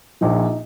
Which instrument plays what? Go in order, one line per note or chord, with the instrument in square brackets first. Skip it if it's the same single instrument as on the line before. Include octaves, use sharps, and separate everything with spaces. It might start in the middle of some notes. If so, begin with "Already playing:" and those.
[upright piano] A#1 A#2 F3 D#4